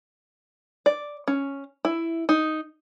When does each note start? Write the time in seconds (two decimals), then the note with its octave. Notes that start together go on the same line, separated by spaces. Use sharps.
0.86 D5
1.28 C#4
1.85 E4
2.29 D#4